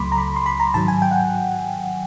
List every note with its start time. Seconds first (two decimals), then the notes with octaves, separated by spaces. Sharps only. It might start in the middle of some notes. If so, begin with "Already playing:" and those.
Already playing: C#2 C#3 F#3 A3 B5 C6 D6
0.12 A#5
0.18 B5
0.36 C6
0.46 B5
0.60 A#5
0.74 G#2 D#3 F#3 A5
0.88 G#5
1.02 G5
1.11 F#5